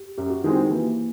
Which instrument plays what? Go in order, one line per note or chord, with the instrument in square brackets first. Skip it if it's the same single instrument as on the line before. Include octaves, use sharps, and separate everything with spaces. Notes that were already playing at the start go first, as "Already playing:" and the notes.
Already playing: [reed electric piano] G4
[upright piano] F#2 [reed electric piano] G4
[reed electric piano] F#4
[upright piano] D#3 G#3 C4 [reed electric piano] E4
[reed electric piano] D#4
[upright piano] E3 [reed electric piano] A#3